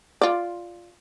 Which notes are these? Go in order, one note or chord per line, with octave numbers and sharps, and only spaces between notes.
F4 D5